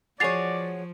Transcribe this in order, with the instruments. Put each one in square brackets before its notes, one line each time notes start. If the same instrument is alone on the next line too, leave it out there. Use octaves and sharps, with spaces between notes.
[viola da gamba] F3 [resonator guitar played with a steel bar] F#4 G#4 C#5 [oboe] D5 [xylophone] A6 C7 F7